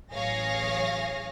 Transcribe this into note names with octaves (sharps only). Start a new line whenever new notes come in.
A1 F#3 G#4 C#5 F5 A#6